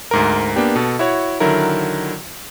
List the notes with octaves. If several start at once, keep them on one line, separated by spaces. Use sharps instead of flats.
D2 G#2 A#4
A#3 B3 D4 G4
B2 A4
E4 F#4 C#5
D3 D#3 F#3 E4 A#4